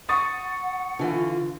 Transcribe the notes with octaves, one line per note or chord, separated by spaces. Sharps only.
F#5 C#6 D#6 A6
D3 E3 F4